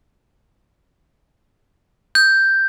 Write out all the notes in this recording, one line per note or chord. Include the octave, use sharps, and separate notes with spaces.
G6